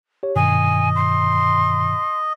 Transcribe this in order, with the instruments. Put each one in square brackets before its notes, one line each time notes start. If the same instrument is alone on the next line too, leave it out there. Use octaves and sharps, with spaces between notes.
[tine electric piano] G4 C#5
[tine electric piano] G2 B2 D#3 [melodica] D#5 [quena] G#5
[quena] C6